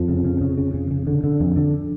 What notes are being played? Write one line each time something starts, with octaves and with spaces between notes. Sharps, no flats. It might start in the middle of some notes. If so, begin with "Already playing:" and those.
Already playing: F2 F3
C#3
C#3
C#3
C#3
C#3
C#3
D3
D3
F2
D3